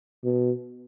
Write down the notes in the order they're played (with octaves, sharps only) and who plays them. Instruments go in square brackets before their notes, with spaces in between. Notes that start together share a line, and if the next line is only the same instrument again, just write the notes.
[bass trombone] B2